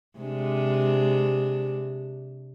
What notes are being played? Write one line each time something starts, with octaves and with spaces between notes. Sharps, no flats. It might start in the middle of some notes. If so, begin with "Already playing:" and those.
C3 G#3 D4